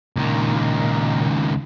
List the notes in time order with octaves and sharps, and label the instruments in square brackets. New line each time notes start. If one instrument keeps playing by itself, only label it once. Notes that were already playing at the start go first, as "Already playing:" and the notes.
[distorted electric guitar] C#2 D#3 [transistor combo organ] A#2